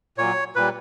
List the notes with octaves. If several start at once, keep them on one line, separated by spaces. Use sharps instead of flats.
A#2 F#3 C#5
A#2 G3 B4